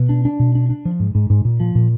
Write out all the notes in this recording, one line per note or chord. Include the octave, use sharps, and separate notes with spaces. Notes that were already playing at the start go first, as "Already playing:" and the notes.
Already playing: B2
D4
D4
B2
D4
D4
F3
G#2
G#2
G#2
A#2
F3
A#2